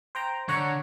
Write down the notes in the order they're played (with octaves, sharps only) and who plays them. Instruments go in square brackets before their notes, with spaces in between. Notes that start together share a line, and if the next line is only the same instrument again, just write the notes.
[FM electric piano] C5 G5 A#5
[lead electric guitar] D3 [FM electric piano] C#5 F#5 A#5